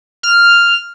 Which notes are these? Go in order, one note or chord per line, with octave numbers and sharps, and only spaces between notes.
F6